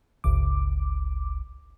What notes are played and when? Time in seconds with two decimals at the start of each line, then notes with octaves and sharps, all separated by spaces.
0.24 G1 C#2 D6